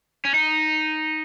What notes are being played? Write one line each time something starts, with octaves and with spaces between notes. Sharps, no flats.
C#4
D#4